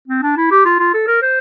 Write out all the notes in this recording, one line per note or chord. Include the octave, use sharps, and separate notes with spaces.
C4
D4
E4
G4
F4
F4
A4
A#4
C5